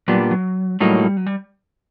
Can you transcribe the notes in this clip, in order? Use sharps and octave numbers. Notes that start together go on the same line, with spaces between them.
A#2 F#3 G3 B3 D4
F#3
A2 F#3 G3 A#3 D#4
G3
F#3
G3